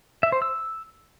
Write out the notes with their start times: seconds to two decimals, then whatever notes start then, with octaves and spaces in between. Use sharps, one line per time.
0.23 E5
0.32 C5
0.42 E6